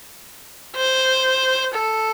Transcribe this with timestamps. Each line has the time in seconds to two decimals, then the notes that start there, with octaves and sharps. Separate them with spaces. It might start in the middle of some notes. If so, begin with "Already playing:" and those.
0.76 C5
1.75 A4